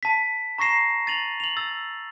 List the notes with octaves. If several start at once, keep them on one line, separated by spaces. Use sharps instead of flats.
A5 B6
A#5 C#6 A#6 C7 E7
A6 D#7 F7 F#7
F7 F#7
E6 A6